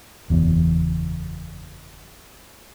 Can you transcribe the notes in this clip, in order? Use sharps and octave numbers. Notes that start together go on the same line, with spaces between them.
F#1 E2